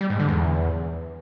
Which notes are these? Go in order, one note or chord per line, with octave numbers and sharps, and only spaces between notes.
G3
G#2
D3
E2